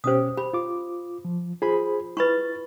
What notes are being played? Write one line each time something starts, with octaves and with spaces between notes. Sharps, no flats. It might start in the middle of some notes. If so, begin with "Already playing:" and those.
B2 C#4 G4 C5 D#6
G4 B5
F4 D6
F3
F4 G#4 C5 B5
E4 B4 B5 C#6 A6